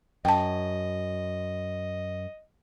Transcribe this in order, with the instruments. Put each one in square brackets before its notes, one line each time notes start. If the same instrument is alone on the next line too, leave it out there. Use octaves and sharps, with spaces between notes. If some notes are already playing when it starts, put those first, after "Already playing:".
[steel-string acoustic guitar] F#2 [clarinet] D#5 [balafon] G5 A5